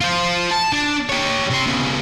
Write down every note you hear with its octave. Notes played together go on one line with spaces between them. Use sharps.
F4 C5
A5
D4
G4 C#5
C3 C6
C#3 B3